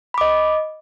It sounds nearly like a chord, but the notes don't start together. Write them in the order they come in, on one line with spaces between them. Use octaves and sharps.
B5 D6 D#5